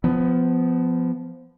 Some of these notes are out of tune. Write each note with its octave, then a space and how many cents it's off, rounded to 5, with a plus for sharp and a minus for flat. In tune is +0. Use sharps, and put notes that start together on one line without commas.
F3 +0 B3 +20